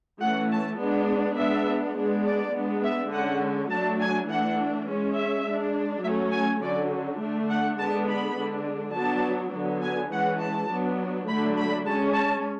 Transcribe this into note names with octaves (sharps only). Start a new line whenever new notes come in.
E3 A3 C#4 F#5
A5
G#3 B3 D4
G#3 B3 D4 E5
G#3 B3 D4
D5
G#3 B3 D4
E5
D3 G#3 C#4 F#5
F#3 A3 D4 A5
G#5
E3 A3 D4 F#5
G#3 C#4
E5
G#3 D4
F#3 A3 C#4 E5
G#5
D3 F#3 C#4 D5
D3 A3 D4
F#5
D3 G#3 B3 D4 A5
B5
D3 G#3 D4
F#3 B3 D4 A5
D3 F#3 B3
G#5
E3 G#3 C#4 F#5
A5
F#3 B3 D4
D3 F#3 A3 D4 B5
B5
G#3 C#4 A5
A5